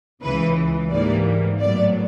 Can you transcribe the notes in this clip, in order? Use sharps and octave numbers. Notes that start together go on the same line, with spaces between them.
C#2 C#3 E3 B4
G#2 E3 G3 A#3 D5
A2 F#3 B3 D5